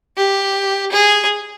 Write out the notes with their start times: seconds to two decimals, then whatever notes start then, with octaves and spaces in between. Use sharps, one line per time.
0.17 G4
0.92 G#4